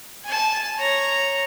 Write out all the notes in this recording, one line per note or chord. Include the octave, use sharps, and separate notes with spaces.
G#5 A5
C#5 A#5